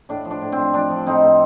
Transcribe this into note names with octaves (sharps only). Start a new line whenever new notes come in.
A2 D4
F3
D4
A2
C4
F3
F3 D4
F3
A2 C4 D#4
A2